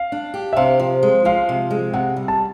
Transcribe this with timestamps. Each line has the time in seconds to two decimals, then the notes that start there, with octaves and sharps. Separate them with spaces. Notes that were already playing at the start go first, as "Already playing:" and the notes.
Already playing: F5
0.12 D4
0.34 G4
0.53 E5
0.57 C3 F5
0.80 F3
1.03 G#3
1.25 F3 F5
1.49 C3
1.71 G#3
1.94 C3 F#5
2.16 G3
2.28 A5